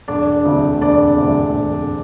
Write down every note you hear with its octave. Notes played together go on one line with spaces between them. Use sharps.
E1 D4 D5
D2 C3
E1 D4 D5
D2 C3
E1